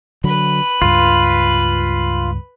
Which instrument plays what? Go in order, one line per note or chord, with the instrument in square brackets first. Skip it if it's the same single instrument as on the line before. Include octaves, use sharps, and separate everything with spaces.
[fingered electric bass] D3 F#3 [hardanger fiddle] B4 B5
[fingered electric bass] C#2 G2 [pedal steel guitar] F4